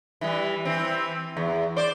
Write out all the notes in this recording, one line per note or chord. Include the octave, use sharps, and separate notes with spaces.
E3 G3
E3 C4
E2
C5 D5